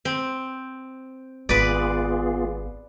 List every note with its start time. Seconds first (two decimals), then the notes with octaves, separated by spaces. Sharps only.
0.05 C4
1.49 G#1 B3 F4 G#4 B4 D5